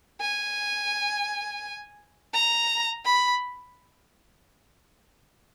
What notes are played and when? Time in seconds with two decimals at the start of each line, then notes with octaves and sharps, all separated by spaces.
0.21 G#5
2.34 A#5
3.05 B5